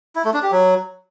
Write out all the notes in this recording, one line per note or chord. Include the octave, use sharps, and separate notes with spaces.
E4
A3
D4
G4
F#3